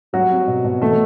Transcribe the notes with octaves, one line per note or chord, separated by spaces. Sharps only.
F#3 G3 F#4
C4
B2
B2
E3 A3 A4